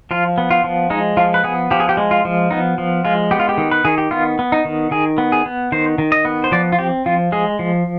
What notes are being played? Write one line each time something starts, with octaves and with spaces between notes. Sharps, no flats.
F3 F4
B3
F4
F3
G#3 D#4
F3 F4
B4
B3 G#4
F3 G4
G#4
G4
G#3
F4
F3
B3 D#4
F3
G#3 F4
B3 G4
F4
G4
D#3
B4
D#3 G#4
G4
B3 F4
B3
D#4
D#3
D#3 G#4
B3
G#4
B3
D#3 C5
D#3
D#5
B3
C5
F3 D5
F4
C4 G4
F3 F4
G#3 G#4
F3